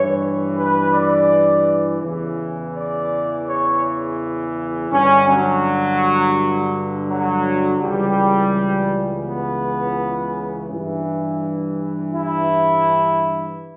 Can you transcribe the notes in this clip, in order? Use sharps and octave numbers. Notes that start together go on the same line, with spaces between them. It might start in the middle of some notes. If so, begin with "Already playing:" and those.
Already playing: G2 E3 C#5
B4
D5
E2 C#3 E3
D5
C#5
G2 D3 C#4
F#3
F#3
C#2 C#3 E3 G3
B3
G2 E3
E4